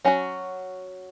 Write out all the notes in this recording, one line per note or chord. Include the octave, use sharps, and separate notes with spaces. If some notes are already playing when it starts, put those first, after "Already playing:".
F#3 C#4 F#4